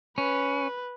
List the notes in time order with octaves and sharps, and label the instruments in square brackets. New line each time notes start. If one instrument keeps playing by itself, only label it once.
[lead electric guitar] C#4 [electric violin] B4